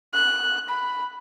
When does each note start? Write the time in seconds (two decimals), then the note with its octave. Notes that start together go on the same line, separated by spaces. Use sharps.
0.14 F#6
0.68 B5